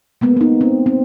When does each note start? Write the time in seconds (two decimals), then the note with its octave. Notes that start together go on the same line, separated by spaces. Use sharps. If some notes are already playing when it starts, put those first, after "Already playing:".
0.21 G#3 A#3 B3
0.37 B3 D#4
0.61 C4
0.86 C4